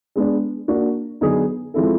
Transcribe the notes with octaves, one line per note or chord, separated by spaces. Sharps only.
G#3 B3 D4
A#3 D4 F#4
D3 F#3 B3 D#4 G#4
F3 G#3 C4 E4 A4